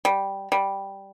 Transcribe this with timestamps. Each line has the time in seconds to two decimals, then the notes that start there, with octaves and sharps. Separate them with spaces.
0.05 G3
0.52 G3